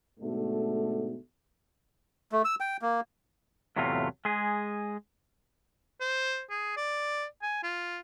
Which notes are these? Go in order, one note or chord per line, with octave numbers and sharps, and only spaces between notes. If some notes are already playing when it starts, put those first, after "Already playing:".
G#2 B2 D3 A3
A3
E6
G5
A#3
E2 A2 C3 F#3 A3 F4
G#3 G#4
C5
G#4
D5
G#5
F4